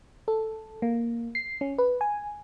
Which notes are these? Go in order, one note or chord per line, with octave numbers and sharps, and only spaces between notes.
A4
A#3
C7
C#4
B4
G#5